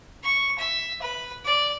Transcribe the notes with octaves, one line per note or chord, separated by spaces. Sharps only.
C#6
E5
B4
D5